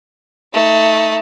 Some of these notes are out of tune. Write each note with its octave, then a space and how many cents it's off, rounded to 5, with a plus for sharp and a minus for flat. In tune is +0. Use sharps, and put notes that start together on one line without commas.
A3 +10 D#4 +30